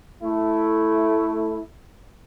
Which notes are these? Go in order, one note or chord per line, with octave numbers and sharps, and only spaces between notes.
A3 E4